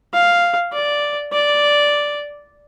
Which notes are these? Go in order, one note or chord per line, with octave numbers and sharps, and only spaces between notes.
F5
D5
D5